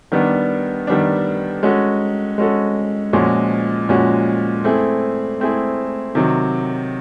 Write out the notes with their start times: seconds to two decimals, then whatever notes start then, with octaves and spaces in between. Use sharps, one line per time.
0.12 D#3 G3 B3 D4
0.87 D#3 G3 B3 D4
1.63 G#3 C#4 F#4 A4
2.38 G#3 C#4 F#4 A4
3.13 A#2 F3 G#3 C#4 F#4
3.89 A#2 F3 G#3 C#4 F#4
4.64 A3 C4 E4 G#4
5.40 A3 C4 E4 G#4
6.15 C3 D#3 F#3